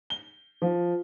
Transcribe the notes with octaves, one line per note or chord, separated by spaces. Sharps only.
G7
F3